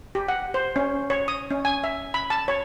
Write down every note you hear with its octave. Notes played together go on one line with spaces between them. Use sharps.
G4
F#5
C5
C#4
C#5
D#6
C#4
G#5
E5
B5
A5
C#5